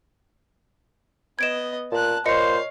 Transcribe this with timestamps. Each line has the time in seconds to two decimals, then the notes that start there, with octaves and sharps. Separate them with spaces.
1.39 B3 D#5 G#6 D7 E7
1.92 A#2 A5 F#6
2.26 A#2 C5 C#5 D#5 F5 C#7